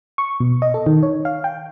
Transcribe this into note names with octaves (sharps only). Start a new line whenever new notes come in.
C#6
B2
D#5
A4
D#3
C#5
F5
G5